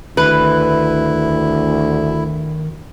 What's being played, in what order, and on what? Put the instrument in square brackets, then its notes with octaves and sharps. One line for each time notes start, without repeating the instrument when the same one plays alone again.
[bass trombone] D2 [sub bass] D#3 [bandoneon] E4 [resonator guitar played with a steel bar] B4